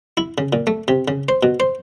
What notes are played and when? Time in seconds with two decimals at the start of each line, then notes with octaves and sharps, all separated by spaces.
0.17 E4
0.38 C#3
0.53 A#2
0.67 A3
0.88 C3
1.08 C#3
1.29 C5
1.43 B2
1.60 C5